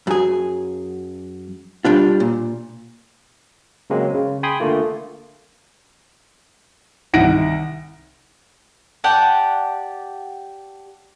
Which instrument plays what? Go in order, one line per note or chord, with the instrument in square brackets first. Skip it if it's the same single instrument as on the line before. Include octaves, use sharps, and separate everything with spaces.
[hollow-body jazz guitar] F#2 G#4
G3 D4 F4
A#2
[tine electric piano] C#3 F#3 G#3 A#3 C4
C#3
G5 G#5 B5 C6 D#6 G#6
D3 A3 A#3 F4
[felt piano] C2 D#3 F#5 A#6 D7
[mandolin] G4 D5 F#5 A5